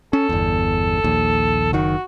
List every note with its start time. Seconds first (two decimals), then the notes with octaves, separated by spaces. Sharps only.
0.13 C#4 A4
0.29 G1 E2
1.04 A#1 D#2
1.73 F#1 D#3 F#4